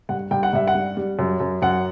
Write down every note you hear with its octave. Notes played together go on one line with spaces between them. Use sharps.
G2 F#5
G2 G5
F#5
G2 E5
F#5
G3
G3
F#2
F#2
F#2 F#5